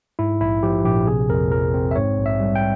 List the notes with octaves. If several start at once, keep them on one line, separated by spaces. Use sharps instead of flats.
G#2 E4
A#1 E4
F3 G4
A#1 G4
C3 G#4
F2 A#4
F3 A#4
C4
E5
G#2 C#5
A#1
E5
G3
G5